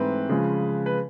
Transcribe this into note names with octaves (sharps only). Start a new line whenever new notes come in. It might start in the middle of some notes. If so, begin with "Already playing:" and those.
Already playing: G#2 E3 A3 C4 B4
C#3 F3 G#3
B4